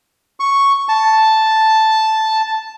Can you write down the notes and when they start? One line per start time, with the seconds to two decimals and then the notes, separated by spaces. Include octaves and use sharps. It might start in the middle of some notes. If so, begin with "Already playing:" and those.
0.40 C#6
0.89 A5